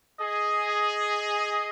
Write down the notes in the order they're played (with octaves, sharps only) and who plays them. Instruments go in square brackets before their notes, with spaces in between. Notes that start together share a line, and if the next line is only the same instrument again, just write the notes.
[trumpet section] G#4 [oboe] D#5